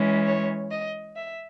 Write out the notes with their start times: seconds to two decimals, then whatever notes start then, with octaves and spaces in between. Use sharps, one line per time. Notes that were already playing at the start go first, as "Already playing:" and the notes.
Already playing: E3 G#3 C#4
0.26 C#5
0.71 D#5
1.17 E5